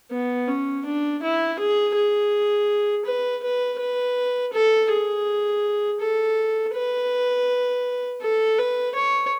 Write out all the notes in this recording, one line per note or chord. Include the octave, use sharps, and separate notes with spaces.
B3
C#4
D4
E4
G#4
G#4
B4
B4
B4
A4
G#4
A4
B4
A4
B4
C#5